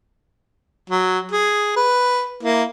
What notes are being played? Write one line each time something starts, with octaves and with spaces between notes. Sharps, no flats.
F#3
G#4
B4
A#3 E4